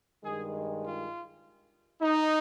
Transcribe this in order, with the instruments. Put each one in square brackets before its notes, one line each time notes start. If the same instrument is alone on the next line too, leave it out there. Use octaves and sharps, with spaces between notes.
[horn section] G2 D#3 G#3 G#4
F4
D#4